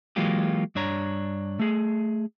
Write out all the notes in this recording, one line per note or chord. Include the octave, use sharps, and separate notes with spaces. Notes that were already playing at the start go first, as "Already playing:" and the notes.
E3 F#3 G#3 A#3 F4 G4
G2 D4 C#5 A#5
A3 G#4